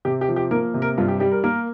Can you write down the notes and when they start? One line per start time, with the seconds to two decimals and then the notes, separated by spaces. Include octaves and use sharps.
0.05 C3 G4
0.21 G4
0.28 F3
0.36 G4
0.51 A#3 A#4
0.74 C3
0.82 A#4
0.98 G2 F4
1.08 G4
1.20 G3 G4
1.32 A#4
1.44 A#3 A#4